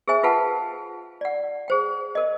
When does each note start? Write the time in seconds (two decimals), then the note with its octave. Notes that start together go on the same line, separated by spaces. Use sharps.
0.08 G#4 A#4 C5 E5 G#5
0.23 F4 A#4 B4 F5 F#5 A5
1.21 D5 F#5
1.68 G#4 C5 G5
2.15 A#4 D#5